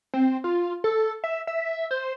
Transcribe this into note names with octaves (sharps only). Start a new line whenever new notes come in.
C4
F4
A4
E5
E5
C5